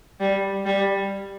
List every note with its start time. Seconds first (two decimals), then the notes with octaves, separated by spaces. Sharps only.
0.20 G3
0.65 G3